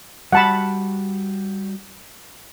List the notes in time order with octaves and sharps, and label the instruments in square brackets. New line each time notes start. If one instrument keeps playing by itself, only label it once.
[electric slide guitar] G3 F#4 [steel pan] F#5 A5 B5